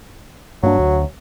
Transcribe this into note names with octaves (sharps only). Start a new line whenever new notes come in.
G2 F#3 A#3 D4
D2